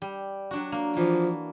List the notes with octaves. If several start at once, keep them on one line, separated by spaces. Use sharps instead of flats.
G3
F#3 D4 F#4
A#3
E3 F3